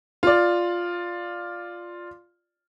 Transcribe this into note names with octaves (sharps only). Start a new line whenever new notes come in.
F4 D5